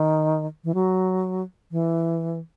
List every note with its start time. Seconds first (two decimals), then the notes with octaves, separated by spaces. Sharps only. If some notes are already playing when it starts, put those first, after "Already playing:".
Already playing: D#3
0.64 E3
0.74 F#3
1.71 E3